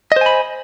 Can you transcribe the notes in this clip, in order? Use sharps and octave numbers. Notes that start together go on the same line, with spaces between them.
C5 D#5 G#5 B5